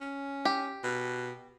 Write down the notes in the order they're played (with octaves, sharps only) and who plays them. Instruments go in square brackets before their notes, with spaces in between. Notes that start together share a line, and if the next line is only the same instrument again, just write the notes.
[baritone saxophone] C#4
[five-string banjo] G4
[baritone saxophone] B2